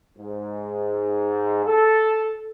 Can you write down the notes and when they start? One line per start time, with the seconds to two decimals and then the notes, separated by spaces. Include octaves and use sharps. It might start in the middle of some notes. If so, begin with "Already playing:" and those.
0.19 G#2
1.65 A4